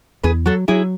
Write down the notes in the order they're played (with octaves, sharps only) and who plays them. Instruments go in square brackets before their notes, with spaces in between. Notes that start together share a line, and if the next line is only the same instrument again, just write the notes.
[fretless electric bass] E2 [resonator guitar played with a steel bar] G#4 B4
[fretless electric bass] F#3 [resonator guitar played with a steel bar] F#4 A4
[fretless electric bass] F#3 [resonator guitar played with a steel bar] E4 G#4